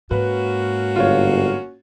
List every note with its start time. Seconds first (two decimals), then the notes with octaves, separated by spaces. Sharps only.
0.11 G#2 A#3 C#4 F#4 B4
0.96 G1 F4 C#5